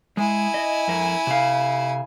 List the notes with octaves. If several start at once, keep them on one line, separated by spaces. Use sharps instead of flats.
G#3 E4 G#5
D#5
F2 A#4
C3 F5